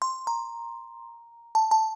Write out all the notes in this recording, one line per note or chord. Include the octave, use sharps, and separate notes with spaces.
C6
A#5
A5
A5